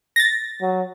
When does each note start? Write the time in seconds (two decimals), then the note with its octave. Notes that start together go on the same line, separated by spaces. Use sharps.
0.16 A6 A#6
0.61 F#3